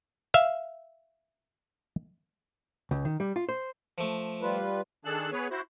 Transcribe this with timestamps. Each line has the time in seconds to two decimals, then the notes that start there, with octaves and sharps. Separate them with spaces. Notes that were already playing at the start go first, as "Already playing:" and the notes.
0.34 E5 F5
2.91 C#2
3.05 D#3
3.20 G3
3.36 F4
3.49 C5
3.98 F3 A3
4.42 G3 F4 B4
5.05 D#3 D4 G#4 A4 A5 F#6
5.32 B3 G#4 B4 C#5
5.50 E4 F#4 C5